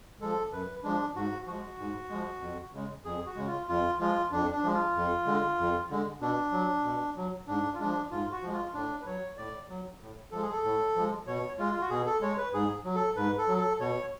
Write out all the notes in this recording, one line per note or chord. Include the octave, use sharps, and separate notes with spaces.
F3 G#3 A4
F#2 B4
F3 G#3 D4
G#2 F#4
F3 G#3 F#4
G#2
F3 G#3
F2
C#3 G#3
F2 G#4
F#4
C#3 G#3
F4
F2 F4
F3 G#3 F4
F2 D4
D4
F3 G#3
F4
F2
D3 G#3
F2
D3 G#3
B2 D4
F#3
B2
F#3
G#2 D4
F4
F3 G#3 D4
G#2 F4
F#4
F3 G#3
F4
A2 D4
B4
F#3 C#5
A2 D5
F#3
A2
F3 G#3 A4
G#4
A4
A2
F3 G#3
B2 C#5
G#3 F4
F4
F#4
B2 G#4
A4
G#3 C#5
B4
G#2 G#4
F#3
A4
G#2 B4
A4
F#3
A4
B2 C#5